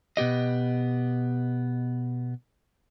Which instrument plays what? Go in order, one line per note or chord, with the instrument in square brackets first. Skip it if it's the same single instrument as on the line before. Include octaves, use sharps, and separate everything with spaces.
[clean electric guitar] B2 B3 G4 D#5